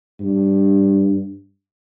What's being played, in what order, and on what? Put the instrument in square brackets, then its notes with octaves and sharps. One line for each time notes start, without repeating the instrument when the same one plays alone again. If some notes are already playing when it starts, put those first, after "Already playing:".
[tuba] G2